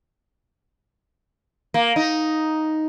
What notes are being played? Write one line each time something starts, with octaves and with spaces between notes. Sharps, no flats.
A#3
D#4